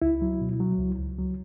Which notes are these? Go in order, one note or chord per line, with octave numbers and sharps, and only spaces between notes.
C#2 E4
F#3
B2
F#3
C#2
C#2
F#3